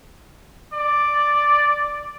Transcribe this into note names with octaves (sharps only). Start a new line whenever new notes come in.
D5